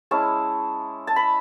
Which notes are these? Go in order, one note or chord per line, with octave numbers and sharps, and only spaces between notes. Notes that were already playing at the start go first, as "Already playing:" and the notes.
G#3 C#4 E4 A5
A5
B5